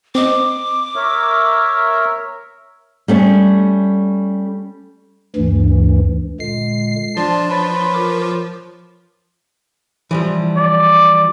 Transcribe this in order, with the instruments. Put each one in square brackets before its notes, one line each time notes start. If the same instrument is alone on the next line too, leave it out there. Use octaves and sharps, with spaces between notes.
[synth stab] C4 D#5 [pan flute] D6
[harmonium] A#4 C#5 E5
[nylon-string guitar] G3 A3 C#4
[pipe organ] D2 G2 E3
[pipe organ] A#2 D3 G#3 [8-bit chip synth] C7
[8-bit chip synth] F3 [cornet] D4 [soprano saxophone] A5 [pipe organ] C6
[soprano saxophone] B4 [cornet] C#5
[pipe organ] F4 A#4 D6
[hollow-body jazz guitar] E3 F3 G3
[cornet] D5